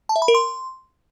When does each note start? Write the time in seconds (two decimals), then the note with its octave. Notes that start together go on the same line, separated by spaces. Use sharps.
0.09 A5
0.16 E5
0.22 B5
0.28 A#4
0.34 C6